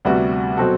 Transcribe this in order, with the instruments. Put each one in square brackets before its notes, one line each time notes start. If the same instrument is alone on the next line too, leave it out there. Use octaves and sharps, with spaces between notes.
[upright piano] D2 C3 G3 B3 F#4
B2 F#3 C4 F#4 A4